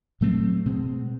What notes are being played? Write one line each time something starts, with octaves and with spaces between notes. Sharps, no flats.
A#2 F#3 A3 C4
B2 G#3 C4